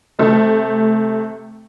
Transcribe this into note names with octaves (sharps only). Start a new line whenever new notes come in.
C3 A3